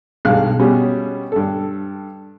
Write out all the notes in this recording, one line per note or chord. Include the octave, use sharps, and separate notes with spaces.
B1 G2 G#3 F5 F#6
B2 G3 C#4 G4 G#4
G2 A4